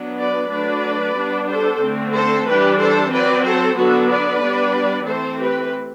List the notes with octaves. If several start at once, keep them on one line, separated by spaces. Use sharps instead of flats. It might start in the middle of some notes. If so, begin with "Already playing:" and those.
Already playing: F#3 B3 D4
B4 D5
F#3 A3 D4 B4 D5
G3 B3 D4
A4 C5
D3 A3 C4
A4 C5
E3 G3 D4 G4 B4
A4 C5
F#3 C4 B4 D5
A4 C5
D3 F#3 B3 D4 F#4 A4
B4 D5
G3 B3 D4
E3 A3 C4 A4 C5
G4 B4